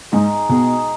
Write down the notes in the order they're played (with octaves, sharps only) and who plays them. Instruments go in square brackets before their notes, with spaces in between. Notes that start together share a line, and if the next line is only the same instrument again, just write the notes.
[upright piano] G#2 [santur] G#3 D#4 G#4
[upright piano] B2 [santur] G#3 D#4 G#4